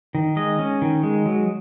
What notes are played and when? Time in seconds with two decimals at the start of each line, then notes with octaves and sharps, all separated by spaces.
0.15 D#3
0.36 G#3 D#5
0.59 C#4
0.82 D#3
1.03 G#3
1.26 F#3